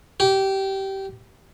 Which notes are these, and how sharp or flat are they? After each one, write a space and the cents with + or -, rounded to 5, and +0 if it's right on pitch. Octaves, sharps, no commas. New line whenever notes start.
G4 -20